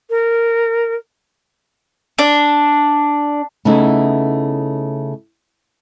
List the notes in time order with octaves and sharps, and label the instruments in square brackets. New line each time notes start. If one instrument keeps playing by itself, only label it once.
[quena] A#4
[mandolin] D4
[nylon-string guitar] C#3 A3 B3 D#4 E4